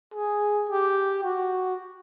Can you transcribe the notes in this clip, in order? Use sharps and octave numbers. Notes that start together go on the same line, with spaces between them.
G#4
G4
F#4